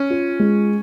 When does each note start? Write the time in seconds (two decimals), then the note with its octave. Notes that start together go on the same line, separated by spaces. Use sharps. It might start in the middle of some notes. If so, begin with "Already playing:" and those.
Already playing: C#4
0.10 F4
0.40 G#3